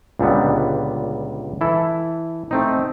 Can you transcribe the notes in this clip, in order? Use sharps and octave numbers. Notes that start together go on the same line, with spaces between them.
C#2 A#2 D3 G3 B3
E3 E4 A4
A3 C4 D#4